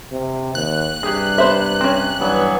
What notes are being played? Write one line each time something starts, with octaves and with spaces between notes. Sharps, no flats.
C3
D#2 F#6
G2 C3 G4 G#4
B3 C5 E5
C4 C#4
G2 E3 F#3 B3